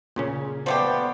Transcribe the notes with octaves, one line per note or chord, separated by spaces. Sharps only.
A#2 C#3 C#4
F3 A3 B3 G4 C5 D5 A5